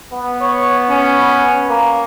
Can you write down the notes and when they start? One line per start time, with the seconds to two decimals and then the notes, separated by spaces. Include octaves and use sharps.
0.12 B3
0.42 C#5
0.90 C#4
1.70 A#3